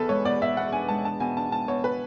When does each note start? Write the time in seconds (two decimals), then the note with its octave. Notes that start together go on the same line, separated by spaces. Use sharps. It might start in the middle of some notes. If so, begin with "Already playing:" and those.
Already playing: E2 A4 B4
0.09 G#3 C#5
0.25 B2 D5
0.41 B2 E5
0.57 E2 F#5
0.72 D4 G#5
0.88 G#3 A5
1.04 D4 A5
1.20 B2 G#5
1.37 D4 A5
1.52 D4 A5
1.68 B2 C#5
1.84 B4